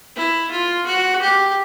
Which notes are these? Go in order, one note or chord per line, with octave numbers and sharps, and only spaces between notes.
E4
F4
F#4
G4